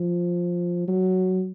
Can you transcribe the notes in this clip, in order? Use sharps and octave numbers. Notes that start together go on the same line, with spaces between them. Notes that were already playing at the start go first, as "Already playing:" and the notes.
Already playing: F3
F#3